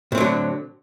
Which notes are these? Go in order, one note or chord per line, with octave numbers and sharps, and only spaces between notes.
A2 D3 F#3 C4